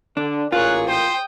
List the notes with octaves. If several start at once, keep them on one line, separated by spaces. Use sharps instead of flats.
D3 D4
A1 A#2 F4 G#4 A#4 C#5 F#6
C5 G5 D#6